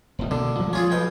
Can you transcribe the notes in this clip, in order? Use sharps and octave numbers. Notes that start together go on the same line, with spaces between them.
E1 A2 G3
B2 D3 D#3 A#3
F3 G#3 A3
F3 C#4 F4 G#4
B1 B2 G5